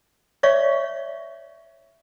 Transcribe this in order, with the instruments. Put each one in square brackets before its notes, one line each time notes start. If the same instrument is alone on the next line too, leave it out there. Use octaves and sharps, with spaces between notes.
[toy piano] C#5 D5 E5 F5 C#6